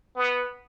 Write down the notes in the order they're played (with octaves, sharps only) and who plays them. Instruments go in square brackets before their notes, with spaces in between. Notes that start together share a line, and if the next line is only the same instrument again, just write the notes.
[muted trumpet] B3